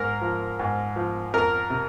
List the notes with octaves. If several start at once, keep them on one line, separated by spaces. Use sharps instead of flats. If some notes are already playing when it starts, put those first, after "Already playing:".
Already playing: G#2 A#4
F3
G#2
F3
F2 A#4
C3